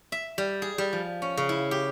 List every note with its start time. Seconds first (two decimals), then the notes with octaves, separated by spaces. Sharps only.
0.12 E5
0.38 G3
0.62 G#4
0.78 G3
0.93 F3
1.22 C#4
1.37 C#3
1.49 E4
1.71 G4